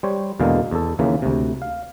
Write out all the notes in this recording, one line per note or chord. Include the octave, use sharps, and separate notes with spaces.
G3 C5 C#5
E2 B2 D3 G#3 A#3 F5
E2 A4
D#2 C#3 E3 A#3
D2 C3
F5